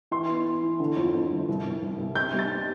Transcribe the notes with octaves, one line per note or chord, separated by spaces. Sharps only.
E3 C6
B3
B3
E3
D3
F2
F2
G1
C2
C2
C2
C2
C3 G6
G3
A6